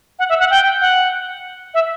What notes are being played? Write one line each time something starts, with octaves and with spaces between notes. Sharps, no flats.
F#5
E5
F#5
G5
F#5
E5